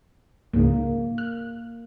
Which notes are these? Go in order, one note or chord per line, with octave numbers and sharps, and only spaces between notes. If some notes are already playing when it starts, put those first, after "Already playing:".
C#2 G#2 C#3 A#3
F6 F#6